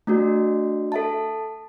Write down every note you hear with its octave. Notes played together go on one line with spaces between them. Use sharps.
A3 D4 F#4
A4 E5 A5